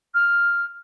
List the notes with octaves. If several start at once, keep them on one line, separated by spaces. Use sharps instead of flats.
F6